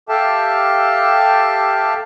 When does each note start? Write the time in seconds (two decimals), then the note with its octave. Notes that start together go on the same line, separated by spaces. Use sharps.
0.09 G4 A4 E5 F5 G5 A5